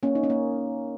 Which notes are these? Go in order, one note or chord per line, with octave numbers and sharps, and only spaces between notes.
A#3 C#4
D#4
C#4
A#3